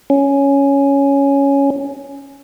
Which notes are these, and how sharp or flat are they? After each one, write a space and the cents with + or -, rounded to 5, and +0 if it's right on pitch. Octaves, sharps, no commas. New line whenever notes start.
C#4 +5